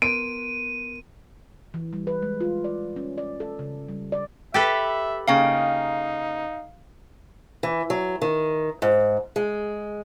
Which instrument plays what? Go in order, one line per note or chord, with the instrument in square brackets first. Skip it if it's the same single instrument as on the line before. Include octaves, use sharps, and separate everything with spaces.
[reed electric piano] B3 A#4 C6 [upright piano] D7 [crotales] D#7
[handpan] E3
G3
B4
G#3
F4
D5
C#4
D5
A4
C#3
G3
D5
[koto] G4 A4 B4 [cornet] E5
[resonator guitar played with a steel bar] C#3 A#3 G5 [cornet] D#4 [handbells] F5
[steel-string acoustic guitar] E3
F#3
D#3
G#2
G#3